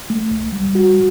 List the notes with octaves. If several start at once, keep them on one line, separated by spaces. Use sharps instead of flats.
A3
C2
G3
F#4